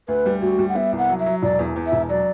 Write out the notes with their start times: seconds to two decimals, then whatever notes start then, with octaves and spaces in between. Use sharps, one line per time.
0.08 D2 B4
0.26 G3
0.42 D2 F#4
0.59 G3
0.69 F#5
0.75 B3 E5
0.92 C2
0.98 F#5
1.09 F#3
1.20 E5
1.26 F#3
1.42 E1 D5
1.59 E2
1.76 E2
1.87 E5
1.92 E1
2.09 F#3 D5